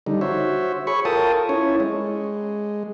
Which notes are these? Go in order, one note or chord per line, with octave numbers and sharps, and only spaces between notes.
D3 G3 D#4
F#4 C5 C#5 E5
G#4 C#5 B5 C#6
F4 A4 A#4 G5 A5 D#6
C#4 E4 C#5
G#3